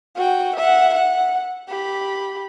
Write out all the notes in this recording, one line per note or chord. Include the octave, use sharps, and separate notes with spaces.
F#4 G5
E5 F#5
F#5
G4 B5